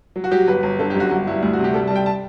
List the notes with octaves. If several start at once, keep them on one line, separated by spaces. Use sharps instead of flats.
F#3
F#4
F#3 G4
G1 B4
G1
D3 A4
G4
F#2 F#4
G1 F#4
G2 E4
D2 E4
F#4
C3
G4
G3 A4
A5
G3
G5
A5